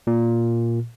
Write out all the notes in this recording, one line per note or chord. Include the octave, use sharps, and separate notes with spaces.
A#2